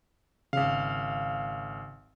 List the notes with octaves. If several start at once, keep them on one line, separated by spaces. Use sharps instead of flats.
G#1 C#3 F5